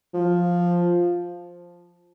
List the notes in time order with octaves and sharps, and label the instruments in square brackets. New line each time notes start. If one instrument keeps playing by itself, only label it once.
[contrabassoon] F3